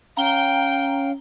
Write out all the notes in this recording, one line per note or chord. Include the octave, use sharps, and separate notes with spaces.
C#4 F5 G5 A#5 G7